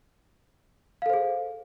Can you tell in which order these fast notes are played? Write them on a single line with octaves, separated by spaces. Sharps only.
F5 A4 C5 G#4